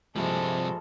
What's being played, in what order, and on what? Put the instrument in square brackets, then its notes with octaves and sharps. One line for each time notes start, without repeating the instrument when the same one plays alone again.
[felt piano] A#1 G2 [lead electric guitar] C3 G3 [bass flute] F3 [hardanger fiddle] G#3 A4